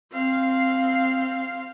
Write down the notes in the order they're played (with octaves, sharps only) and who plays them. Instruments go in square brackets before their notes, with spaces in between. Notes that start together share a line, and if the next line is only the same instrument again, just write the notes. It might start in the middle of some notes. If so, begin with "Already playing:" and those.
[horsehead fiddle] C4 F5